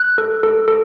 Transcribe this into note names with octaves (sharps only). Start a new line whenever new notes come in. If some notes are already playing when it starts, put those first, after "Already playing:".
Already playing: F#6
A4
A4
A4